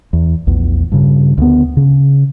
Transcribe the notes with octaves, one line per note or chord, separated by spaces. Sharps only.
E2
A#1 E2
G2 C#3
D2 B3
C#3